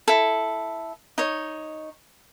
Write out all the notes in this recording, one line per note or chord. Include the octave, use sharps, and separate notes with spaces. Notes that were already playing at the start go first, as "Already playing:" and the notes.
E4 A4
D#4 C#5